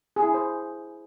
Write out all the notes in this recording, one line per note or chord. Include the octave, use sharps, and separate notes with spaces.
G#4
E4
D4
C5